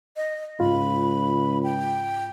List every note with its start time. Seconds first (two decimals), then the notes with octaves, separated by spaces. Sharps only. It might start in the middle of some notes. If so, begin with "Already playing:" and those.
0.16 D#5
0.60 C#2 G#2 F4 B5
1.63 G5